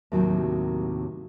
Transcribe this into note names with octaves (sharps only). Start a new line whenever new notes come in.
D#2 A2 C3 D#3 F#3 C4